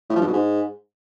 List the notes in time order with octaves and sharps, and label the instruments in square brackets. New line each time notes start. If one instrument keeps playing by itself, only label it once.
[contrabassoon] A2
F3
G2
B2
G#2